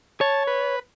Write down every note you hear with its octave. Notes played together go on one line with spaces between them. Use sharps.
C#5 A5
B4